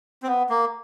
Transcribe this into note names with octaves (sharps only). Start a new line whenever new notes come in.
C4
B3
A#3